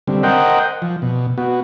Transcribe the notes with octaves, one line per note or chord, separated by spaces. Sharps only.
D3 G3 C4
A#4 C5 D#5 F#5 G5
F3
B2
B3 F#4